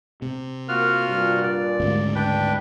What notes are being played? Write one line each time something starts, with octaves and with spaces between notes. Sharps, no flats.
C3
A#3 F4 F#4 F6
G2 A#2
D5
D2 G#2 C#3
D4 B4 G5